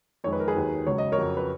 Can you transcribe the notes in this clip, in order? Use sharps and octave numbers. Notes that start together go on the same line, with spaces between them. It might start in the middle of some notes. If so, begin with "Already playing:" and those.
F2 D#3 G#3 C#5
B4
A#4
G#4 B4
D#2 D#3 F#3
C#2 C#3 F#3 C#5
D#5
A#4 C#5
F2 C#3 F#3
B4